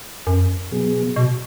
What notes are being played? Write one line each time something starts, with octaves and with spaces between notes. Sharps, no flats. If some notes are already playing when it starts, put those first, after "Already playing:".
F#2
B2 F#3 B3 G#4
B2